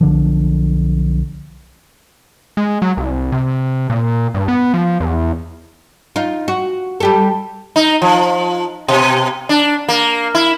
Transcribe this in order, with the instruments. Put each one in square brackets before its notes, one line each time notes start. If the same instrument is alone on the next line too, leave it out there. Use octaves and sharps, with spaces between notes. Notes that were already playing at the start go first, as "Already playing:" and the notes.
[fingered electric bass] B1 D3 F3
[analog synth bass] G#3
F#3
C2
C3
A#2
G2
B3
F3
E2
[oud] D#4 F4
F#4
G3 G4 A4
[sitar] D#4
F3
B2
D4
A#3
E4